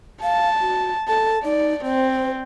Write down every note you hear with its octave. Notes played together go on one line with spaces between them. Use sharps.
F5 A5
F#4
A4 A5
D#4 D5
C4 C5